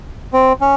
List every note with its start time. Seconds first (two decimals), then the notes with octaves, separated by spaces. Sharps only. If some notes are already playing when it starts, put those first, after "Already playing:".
0.33 C4
0.61 C#4